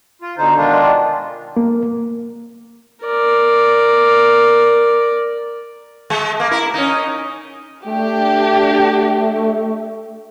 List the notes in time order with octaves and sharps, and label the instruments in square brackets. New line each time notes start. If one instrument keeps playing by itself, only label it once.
[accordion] F4
B2 D3 D#4 C5
B2 D#3 G#3 D4 F4
[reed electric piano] A#3
[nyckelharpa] A#4 D5
[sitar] G#3
A#3
E4 A#4
C#4 D#4
[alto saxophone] A3 [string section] D4 G4